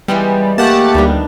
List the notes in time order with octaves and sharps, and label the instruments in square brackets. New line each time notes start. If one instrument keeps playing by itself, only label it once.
[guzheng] E3 G#3 B3 [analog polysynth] G3
[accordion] A3 G4 [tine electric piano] A#3 [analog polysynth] F#5 A5
[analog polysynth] D2 G3 [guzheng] D#3 B3 D4